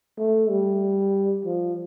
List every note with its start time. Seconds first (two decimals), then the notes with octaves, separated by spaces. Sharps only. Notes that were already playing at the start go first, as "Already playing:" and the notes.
0.18 A3
0.50 G3
1.45 F3